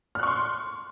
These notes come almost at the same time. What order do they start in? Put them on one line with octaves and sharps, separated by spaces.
F6 F#6 C#6 C6